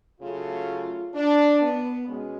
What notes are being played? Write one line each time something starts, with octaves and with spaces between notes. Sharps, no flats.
C#3 F#3 A3 F4
D4
B3
B2 G#3 C#4